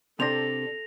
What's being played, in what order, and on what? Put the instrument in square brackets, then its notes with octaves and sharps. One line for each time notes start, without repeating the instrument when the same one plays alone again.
[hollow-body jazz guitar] C3 C4 D4 [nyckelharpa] A4 [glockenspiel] A#6 F7